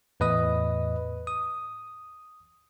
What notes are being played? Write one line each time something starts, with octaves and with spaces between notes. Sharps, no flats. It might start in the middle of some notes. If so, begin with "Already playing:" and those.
E2 A2 B4 D#5 D#6
D#6